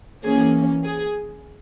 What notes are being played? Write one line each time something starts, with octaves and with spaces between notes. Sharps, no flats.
E3 A#3 C#4 G#4
G#4